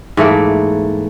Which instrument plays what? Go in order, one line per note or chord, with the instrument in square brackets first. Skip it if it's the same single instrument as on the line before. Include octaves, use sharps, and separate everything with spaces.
[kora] G#2 E3 A3 A#3